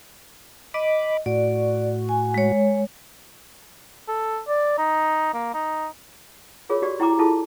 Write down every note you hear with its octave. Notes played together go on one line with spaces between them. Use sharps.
D#5 B5 D6
A2 F#4 D5
G#5
G#3 C#5
A4
D5
D#4
A#3
D#4
F4 G#4 A#4 C#5
F#4 G4 D5
E4 G5 A#5 D6
E4 F4 G#4 A4 A5